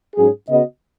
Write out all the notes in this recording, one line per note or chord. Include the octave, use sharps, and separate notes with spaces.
G#2 F#3 C#4 G#4
C#3 B3 F#4 D#5